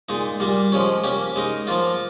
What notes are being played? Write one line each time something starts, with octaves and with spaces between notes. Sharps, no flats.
A#2 G#3 D#4
A#2 G3 A#3
F3 G#3 C#4
A#3 C#4 G4
G#3 D#4 A#4
F3 A#3 F4